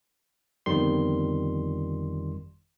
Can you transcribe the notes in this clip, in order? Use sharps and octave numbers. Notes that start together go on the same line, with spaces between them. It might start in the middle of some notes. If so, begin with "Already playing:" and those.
G1 F2 D#3 G3 C6